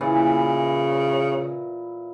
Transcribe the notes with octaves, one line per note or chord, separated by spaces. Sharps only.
A#2 C#3 E3